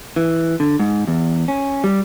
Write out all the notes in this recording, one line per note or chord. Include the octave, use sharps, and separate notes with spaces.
E3
D3
G#2
E2
C#4
G3